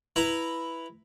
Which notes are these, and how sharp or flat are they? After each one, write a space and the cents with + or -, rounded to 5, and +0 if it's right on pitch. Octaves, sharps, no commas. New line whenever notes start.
E4 +0 B4 +0 A#5 -5